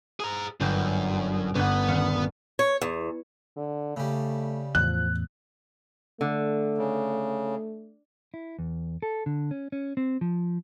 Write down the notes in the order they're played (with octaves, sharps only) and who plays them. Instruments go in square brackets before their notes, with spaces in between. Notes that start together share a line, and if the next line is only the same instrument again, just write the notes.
[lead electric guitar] G#4 A#5
[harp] G1 G5 E7 [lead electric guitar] F#2
[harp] G1 D4 F#5 [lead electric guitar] B3
[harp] D#1 F5 C#7
[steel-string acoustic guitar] C#5
E2
[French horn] D3
[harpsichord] C#3 G3 [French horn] A3
[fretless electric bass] E2 A2 [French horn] F3 [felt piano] F#6
[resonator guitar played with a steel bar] D3 [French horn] A3
[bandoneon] C#3
[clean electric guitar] E4
E2
A4
D3
C#4
C#4
C4
F3